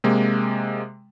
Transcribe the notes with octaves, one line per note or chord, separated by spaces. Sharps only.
C3 G#3 A#3